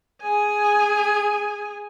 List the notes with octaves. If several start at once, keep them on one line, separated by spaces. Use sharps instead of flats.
G#4 G#5